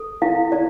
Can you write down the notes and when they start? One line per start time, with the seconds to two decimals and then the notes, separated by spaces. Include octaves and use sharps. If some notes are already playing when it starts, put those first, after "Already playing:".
Already playing: A4
0.22 E4 F5
0.52 E4 D5